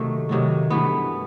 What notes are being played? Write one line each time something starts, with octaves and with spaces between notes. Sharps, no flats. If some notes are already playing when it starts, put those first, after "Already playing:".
Already playing: C3 D#3 F#3 A3
C3 D#3 F#3 A3
G2 E3 A3 B3